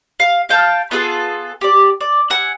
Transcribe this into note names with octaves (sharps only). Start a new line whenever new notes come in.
F5
F5 G5 A5 F6
B3 F4 G#4 A4
G4 D5
D5
F#5 G#5 E6